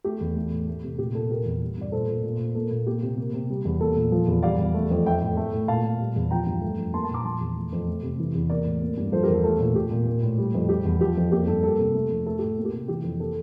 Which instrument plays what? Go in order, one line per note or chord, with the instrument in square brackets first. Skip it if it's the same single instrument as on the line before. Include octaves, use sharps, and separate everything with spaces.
[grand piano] A3 G4
E2
A3
A2
A3
C3
A#2 G4
A#2 A4
A#3 G4 A#4
E2
G3
G2 D5
A#2 A4 C5
A#2
A#2
A#2
A#3 A4
A#2
A#3 G4
C3
A#3
C3
G3
E2
A#3 A4
A#2
F3
E2
G3 D5 F5
E2
A3
F2
A3 E5 G5
A2
A3
A2
A#2 F5 A5
A#2
G3
E2
F3 G5 A#5
G2
A3
F2
A#3 A5 C6
A5 C6
A#2
A#5 D6
F3 A5 C6
E2
A3
F2
A3
C3
E3
E2
A#3 A#4 D5
A2
A#3
G2
F3 A4 C5
G4 A#4
E2 A4
A3 A4
A#2
A#2 G4
A#2
A#3
A2
G3
F2
G3 G4
E2
F3 G4
F2
A#3 G4
G2 A4
A#3 A4
C3
A3
F2
A3 A4
A2 G4
A#3
G4
C3
E3 G4
F2
A#3 A4